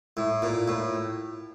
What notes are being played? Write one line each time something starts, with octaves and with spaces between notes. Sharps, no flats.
A2
A#2
A2